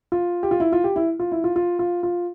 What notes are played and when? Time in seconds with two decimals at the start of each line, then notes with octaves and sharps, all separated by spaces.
0.12 F4
0.43 G4
0.51 F4
0.60 E4
0.72 F4
0.84 G4
0.96 E4
1.20 F4
1.32 E4
1.44 F4
1.56 F4
1.79 F4
2.03 F4